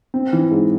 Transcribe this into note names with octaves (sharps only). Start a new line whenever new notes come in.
C4
E3
G#2